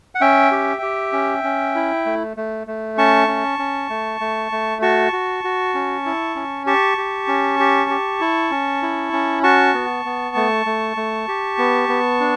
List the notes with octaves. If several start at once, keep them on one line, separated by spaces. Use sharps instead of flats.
F#5
C#4 E5 G5
G4
G4
C#4
C#4
E4
A3
A3
A3
C#4 A5 C#6
C#4
C#4
A3
A3
A3
F#4 A5 C#6
F#4
F#4
C#4
E4
C#4
G4 A5 C#6
G4
C#4
G4
G4
E4
C#4
E4
C#4
F#4 A5 C#6
B3
B3
A3
A3
A3
G4
B3
B3
D4